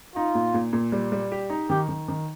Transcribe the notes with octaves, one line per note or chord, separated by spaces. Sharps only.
D#4 F4
A#2
A#2
A#2
G3
G3
G4
D#4
D#3 G4
D#3
D#3